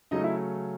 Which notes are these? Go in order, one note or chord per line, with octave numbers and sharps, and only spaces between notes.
C#3 F#3 A3 C#4 D#4 D#5
E4 E5